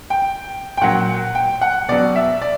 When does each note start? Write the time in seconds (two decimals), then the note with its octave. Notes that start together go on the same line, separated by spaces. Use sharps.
0.10 G5
0.77 G5
0.81 A#2 F#3 F#5
1.35 G5
1.61 F#5
1.88 B2 F#3 D5
2.16 E5
2.41 D5